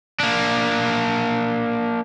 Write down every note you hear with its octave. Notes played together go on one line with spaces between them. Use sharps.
A#3 D4